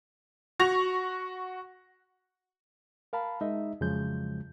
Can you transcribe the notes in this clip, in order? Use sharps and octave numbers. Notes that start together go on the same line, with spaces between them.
F#4 C#6 A#6 F7
A#4 F5 A5 B5
G#3 D#4 D#5 E5
F2 C#3 F3 F#3 G#3 G6